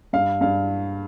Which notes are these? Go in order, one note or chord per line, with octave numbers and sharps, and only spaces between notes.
G2 F5
G2 F5